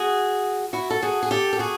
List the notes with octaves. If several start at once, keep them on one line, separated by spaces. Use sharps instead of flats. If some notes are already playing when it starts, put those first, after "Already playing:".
Already playing: F#4 G#4
E4 F#4
A4
F#4 G#4
G#4
G4 A4
A4
F#4 G#4